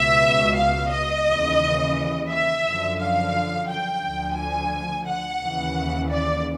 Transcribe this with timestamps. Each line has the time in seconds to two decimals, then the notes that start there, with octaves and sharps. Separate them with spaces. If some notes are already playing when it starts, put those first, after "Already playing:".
Already playing: C#2 B2 E5
0.57 F5
0.92 D#5
1.27 D#2 C#3 E3
2.31 E5
2.66 F#2 D3 F3
3.00 F5
3.69 G5
4.04 D2 D3 F3
4.38 G#5
5.07 F#5
5.42 D#2 C#3 E3
6.11 D5